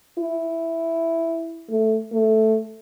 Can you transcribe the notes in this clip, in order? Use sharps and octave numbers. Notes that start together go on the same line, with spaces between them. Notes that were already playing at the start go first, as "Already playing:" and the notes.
E4
A3
A3